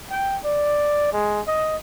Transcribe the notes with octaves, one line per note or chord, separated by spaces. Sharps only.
G5
D5
G#3
D#5